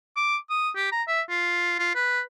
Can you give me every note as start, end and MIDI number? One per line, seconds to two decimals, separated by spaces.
0.16 0.36 86
0.50 0.70 87
0.76 0.88 67
0.92 1.02 82
1.08 1.21 76
1.30 1.78 65
1.79 1.95 65
1.95 2.20 71